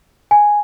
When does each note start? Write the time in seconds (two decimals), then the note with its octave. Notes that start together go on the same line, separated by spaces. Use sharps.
0.31 G#5